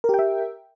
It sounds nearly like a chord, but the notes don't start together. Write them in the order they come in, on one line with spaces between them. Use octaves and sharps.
A#4 G4 G5 E5